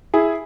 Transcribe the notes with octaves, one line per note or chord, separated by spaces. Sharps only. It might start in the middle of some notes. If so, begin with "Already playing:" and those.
E4 G#4